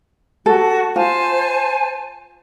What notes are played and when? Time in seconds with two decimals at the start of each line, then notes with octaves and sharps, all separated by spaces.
0.46 F#4 A4
0.96 F4 C5 G#5 A5